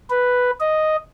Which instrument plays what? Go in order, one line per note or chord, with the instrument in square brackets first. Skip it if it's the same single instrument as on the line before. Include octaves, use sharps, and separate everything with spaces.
[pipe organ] B4
D#5